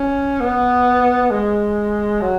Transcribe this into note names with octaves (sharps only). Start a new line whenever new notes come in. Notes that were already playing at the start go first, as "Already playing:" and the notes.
Already playing: C#4
B3
G#3
F#3